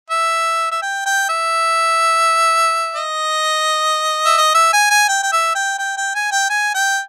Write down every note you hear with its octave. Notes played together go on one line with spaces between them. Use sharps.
E5
E5
G5
G5
E5
D#5
E5
D#5
E5
G#5
G#5
G5
G5
E5
G5
G5
G5
G#5
G5
G#5
G5